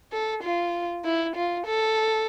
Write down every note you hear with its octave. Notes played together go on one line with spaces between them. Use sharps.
A4
F4
E4
F4
A4